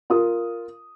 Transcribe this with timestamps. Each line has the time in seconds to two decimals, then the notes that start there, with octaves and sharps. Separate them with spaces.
0.10 F4 A#4 D#6